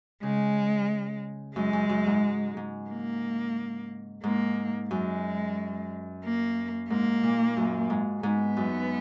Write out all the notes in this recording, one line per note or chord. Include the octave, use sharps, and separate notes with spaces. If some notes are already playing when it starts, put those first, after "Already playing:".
C#3 G#3
F#2 G#3
F#2
F#2
G#2
G#2
A#3
G#2 A#3
F#2 G#3
A#3
G#2 A#3
A#2
F#2
G#2
G#2 B3
F#2